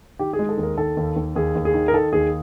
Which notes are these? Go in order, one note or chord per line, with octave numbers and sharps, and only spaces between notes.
D#3 G4
G#4
G#3
A4
D#2
A#4
D#3 A4
D#2
D#2
D#2 G#4
D#2
G#4
D#3
A#4
D#3 A4
D#2 G#4